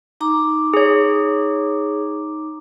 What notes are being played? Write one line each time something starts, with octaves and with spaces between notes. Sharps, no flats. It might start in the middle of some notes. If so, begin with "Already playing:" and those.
D#4 A#5 D6
G#4 C#5